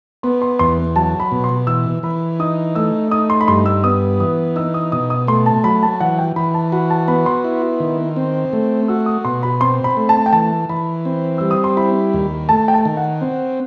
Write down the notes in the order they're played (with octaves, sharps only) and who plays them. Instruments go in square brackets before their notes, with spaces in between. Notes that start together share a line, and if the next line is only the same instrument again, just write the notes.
[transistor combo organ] B3 [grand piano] C6
[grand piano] C6
[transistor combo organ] E2 [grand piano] C6
[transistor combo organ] F#3 [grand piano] A5
[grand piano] B5
[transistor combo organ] B2
[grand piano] C6
[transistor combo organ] E3 [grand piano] E6
[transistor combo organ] E3 [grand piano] B5
[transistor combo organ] D#4 [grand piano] D#6
[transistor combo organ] A3 [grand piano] E6
[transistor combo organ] D#4 [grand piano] D#6
[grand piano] C6
B5
[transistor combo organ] G2 [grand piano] C6
[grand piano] E6
[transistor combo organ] B3 [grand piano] D#6
[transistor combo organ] E3 [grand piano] D#6
[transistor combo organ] D#4 [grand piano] E6
[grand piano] D#6
[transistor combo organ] B2 [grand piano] D#6
[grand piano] D#6
[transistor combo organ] A3 [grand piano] C6
[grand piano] A5
[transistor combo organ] F#3 [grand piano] B5
[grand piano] A5
[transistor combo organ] E3 [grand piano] F#5
[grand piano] G5
[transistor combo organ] E3 [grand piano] B5
[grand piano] A5
[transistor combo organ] F#4 [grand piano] B5
[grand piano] A5
[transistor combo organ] B3 [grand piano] B5
[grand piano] C6
[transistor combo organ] E4
D#3
C4
A3
[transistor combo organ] F#4 [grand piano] E6
[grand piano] D#6
[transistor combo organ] B2 [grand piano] C6
[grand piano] B5
[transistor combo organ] C4 [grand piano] C6
[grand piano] B5
[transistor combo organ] A3
[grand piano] A5
G5
[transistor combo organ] E3 [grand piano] A5
[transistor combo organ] E3 [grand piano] B5
[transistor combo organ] C4
[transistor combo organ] G3 [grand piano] E6
[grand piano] D#6
C6
[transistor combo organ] E4 [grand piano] B5
[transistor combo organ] D#2
[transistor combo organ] A3 [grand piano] A5
[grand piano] G5
A5
[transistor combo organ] D#3
[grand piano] F#5
[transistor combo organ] C4